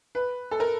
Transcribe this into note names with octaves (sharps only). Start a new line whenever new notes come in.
B4
A4
A#4